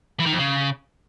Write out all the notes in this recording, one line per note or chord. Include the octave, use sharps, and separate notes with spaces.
E3
D#3
F2
C#3